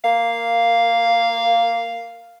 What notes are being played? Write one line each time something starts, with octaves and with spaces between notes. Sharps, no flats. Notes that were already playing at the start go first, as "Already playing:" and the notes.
A#3 F5